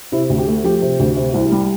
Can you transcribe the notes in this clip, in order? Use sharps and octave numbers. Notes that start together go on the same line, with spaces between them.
C3 E4
D2
G4
A3
F3 G4
C3
D2
C3
C2
G3